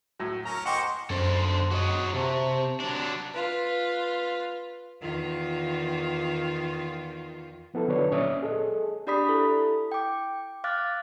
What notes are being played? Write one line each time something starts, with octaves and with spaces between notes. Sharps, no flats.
A2 F#3
C#4 A#4 A#5
C5 D#5 F#5 G5 C#6 D6
F#2 D3 A4 C5
F#4 C#5 D#5
C3 G4 A5 C#6
F#3 D4
F4 B4
E2 D#3 F4
F3 B3 E4 A4
D3 F#3 B4 C#5 D5
A#2 C#4 C#5 D5 E5 D#6
G#4 A4 D#5
D4 G4 D5 B5 D#6 B6
E4 A4
G5 D6
F5 D6 F6 F#6 A6